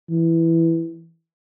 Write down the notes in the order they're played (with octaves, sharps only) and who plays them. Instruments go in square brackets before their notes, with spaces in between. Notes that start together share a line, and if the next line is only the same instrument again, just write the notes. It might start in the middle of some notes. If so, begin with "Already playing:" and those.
[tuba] E3